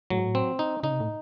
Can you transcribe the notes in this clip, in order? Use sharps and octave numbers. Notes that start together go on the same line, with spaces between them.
A2 F#3
G#2
A2
C4
D#4
C#3 D#4
C3
A2